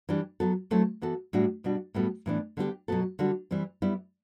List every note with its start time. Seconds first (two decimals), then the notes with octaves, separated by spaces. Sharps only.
0.09 E3 G3 D4 G4
0.40 F#3 B3 F#4 A4
0.71 F#3 A3 C4 E4 A4
1.02 E3 B3 F#4 A4
1.33 A2 G3 D4 F#4
1.64 B2 G3 D4 F#4
1.94 A2 G3 B3 F#4 A4
2.26 A2 E3 B3 D4
2.57 D3 G3 B3 E4 G4
2.88 B2 F#3 B3 F#4 A4
3.19 D3 G3 D4 F#4
3.51 E3 G3 C4
3.82 G3 B3 E4